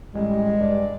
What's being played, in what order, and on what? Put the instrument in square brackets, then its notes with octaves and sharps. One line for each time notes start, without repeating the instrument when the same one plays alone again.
[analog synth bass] A1 [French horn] G3 [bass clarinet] G#3
[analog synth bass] G2 [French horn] D5